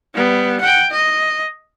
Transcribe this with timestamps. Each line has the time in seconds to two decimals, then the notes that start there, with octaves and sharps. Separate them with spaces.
0.14 G3 B3
0.61 F#5 G5
0.91 D#5